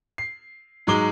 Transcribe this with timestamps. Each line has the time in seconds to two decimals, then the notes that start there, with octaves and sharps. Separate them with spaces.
0.18 C7
0.87 G#2 F#3 G#3 D6 G7